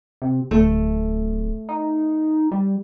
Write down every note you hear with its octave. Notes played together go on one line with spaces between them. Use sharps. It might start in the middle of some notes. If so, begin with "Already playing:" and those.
C3
D1 A3
D#4
G3